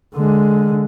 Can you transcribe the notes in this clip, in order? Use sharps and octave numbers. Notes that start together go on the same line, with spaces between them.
D3 G#3